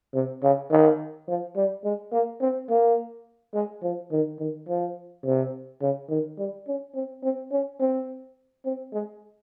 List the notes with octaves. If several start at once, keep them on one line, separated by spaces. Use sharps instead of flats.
C3
C#3
D#3
F3
G3
G#3
A#3
C4
A#3
G#3
F3
D#3
D#3
F3
C3
C#3
D#3
G3
C#4
C4
C4
C#4
C4
C4
G#3